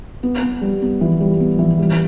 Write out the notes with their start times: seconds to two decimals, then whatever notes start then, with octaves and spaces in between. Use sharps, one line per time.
0.23 B3
0.42 B3
0.61 G3
0.82 B3
1.01 E3
1.20 G3
1.40 B3
1.59 E3
1.79 G3